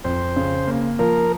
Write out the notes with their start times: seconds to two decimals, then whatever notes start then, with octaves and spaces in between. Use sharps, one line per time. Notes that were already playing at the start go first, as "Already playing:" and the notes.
0.04 F2 C5
0.36 C#3
0.68 A#3
0.99 F3 A#4